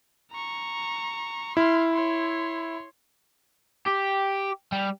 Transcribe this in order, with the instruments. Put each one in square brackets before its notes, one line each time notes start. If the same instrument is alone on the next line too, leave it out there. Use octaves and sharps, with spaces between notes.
[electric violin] A#5 C#6
[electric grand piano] E4 [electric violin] C6 F6
[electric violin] C#5 C6
[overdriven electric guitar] G4
G3